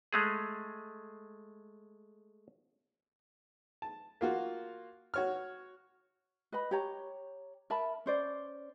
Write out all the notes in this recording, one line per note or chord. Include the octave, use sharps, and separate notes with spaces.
G#3 A3 G#4
A5
A#3 F4 F#4
F#4 C#5 F6
B4 D#5 B5
G4 C#5 A#5
A#4 E5 A5 B5
C#4 C5 D5